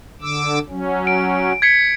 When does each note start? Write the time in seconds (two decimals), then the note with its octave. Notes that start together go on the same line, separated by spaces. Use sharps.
0.22 D3 D6 E6
0.69 F#3 C#4
1.07 D7
1.62 G#6 B6 C#7